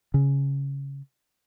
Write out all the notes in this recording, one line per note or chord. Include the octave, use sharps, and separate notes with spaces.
C#3